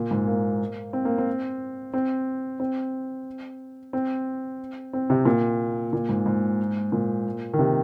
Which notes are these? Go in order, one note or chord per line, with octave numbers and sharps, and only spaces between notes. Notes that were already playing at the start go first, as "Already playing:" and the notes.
Already playing: A#2
G#2
A#3
C4
A#3
C4
C4
C4
C4
C4
C3
A#2
A#2
G#2
G#2
A#2
D#3
C3